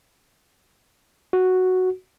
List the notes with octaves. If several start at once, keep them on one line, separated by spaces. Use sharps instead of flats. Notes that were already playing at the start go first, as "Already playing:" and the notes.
F#4